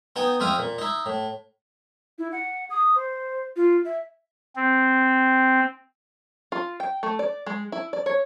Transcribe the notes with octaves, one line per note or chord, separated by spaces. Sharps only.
B3 D#4 G5 G#5
F2 C4 E4 F5 D#6
A#2
D#4 E4
A2
E4
F#5
D#6
C5
F4
E5
C4
F4
G5
A3
D5
G#3
E4
D5
C#5